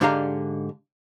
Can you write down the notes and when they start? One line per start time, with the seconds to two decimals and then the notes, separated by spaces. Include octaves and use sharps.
0.01 G#2 D3 D4 G4 F5 A#5